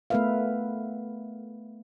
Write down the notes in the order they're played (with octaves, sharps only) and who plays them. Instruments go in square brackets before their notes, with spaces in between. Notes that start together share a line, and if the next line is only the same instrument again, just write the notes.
[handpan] A3 B3 A#4 B4 E5 F5